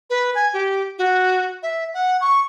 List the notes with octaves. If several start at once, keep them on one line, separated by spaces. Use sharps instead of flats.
B4
G#5
G4
F#4
E5
F#5
C#6